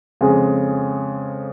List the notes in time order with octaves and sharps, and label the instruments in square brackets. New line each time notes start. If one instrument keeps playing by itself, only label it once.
[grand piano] F2 C#3 G#3